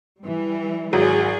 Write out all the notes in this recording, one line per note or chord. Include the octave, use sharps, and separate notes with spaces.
E3 G3
G#1 F#3 G#4